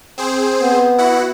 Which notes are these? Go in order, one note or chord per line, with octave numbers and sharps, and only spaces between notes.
C4 G#4 C5
B3
E4 F#4 F#5